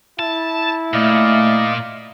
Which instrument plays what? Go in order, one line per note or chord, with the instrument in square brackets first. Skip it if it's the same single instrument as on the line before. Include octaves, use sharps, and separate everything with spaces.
[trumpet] E4 [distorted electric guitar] A5
[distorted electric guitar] A#2 [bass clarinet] A3 [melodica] D5 D#5 F5